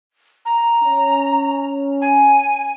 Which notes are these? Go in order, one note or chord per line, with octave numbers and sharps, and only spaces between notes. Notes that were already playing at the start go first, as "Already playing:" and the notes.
A#5
C#4
G#5